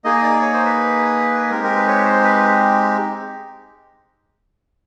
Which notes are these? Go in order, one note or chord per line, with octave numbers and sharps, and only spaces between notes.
A#3 D#4 G#4 D#5
D5
C#5
C5
B4
G#3 C4 D#4 G4 A#4
A#4
B4
C#5
C5
B4